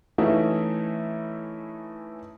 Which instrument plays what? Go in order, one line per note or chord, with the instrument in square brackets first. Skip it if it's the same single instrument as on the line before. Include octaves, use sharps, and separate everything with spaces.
[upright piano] E3 A3 C#4 D#4 E4